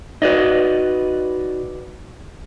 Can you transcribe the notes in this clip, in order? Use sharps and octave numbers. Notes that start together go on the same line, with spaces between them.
D#4 F#4 B4 D5 D#5